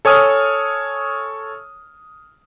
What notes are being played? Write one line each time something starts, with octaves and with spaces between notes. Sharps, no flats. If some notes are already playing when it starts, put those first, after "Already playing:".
A4 C#5 G#5 D#6 F6